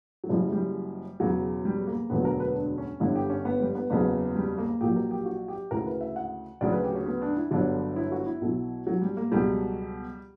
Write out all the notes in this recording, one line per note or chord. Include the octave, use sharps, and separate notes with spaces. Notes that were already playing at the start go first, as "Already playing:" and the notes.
F#3
F#1 F#2 C#3 E3 G3
G3
E1 E2 C#3 F#3
G3
A#3
E1 D2 D3 F#3 B3
A#4
B4
D4
C#4
G1 G2 D3 E4
G4
C#4
B3
G3
B3
F#1 E2 C#3 F#3 B3
G3
A#3
A#1 A#2 F#3 G4
A#4
G4
F#4
G4
D2 C#3 E3 A#4
B4
E5
F#5
D2 C#3 F#3 D5
B4
G4
C#4
B3
D4
E4
G1 G2 D3 F#3 D4
E4
F#4
E4
B1 B2 F#3
F#3
G3
A#3
C#2 B2 F#3 G3